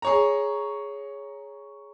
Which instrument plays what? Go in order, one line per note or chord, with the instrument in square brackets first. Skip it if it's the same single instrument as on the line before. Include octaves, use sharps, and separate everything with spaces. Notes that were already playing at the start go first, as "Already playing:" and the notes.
[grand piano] G#4 C#5 A#5